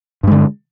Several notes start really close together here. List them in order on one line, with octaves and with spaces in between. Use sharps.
G2 G#3 D3